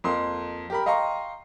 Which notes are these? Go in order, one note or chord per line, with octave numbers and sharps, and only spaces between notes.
F2 A#3 C6
G4 A#4 B5
D#5 F5 G5 A#5 C6 C#6